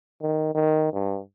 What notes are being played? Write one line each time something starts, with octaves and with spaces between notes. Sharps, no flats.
D#3
D#3
G2